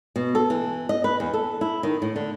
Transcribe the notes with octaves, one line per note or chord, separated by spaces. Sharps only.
B2
A4
E3
D#5
B4
E2
A4
E4
D#3
A2
D3